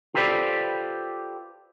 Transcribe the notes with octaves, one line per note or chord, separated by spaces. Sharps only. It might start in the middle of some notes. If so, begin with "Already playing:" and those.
F4 G4 A4 B4 C5 D5